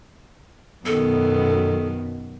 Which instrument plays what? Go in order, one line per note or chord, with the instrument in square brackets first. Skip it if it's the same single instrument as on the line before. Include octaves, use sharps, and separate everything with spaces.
[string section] F#2 B2 [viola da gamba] D#3 B3 [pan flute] A4